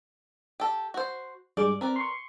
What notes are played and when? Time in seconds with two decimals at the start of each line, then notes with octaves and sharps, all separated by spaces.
0.60 G4 A4
0.94 F#4 C5
1.57 G2 G#3 D5 D6
1.81 C4 A#4 B4 D5
1.96 C6 C#6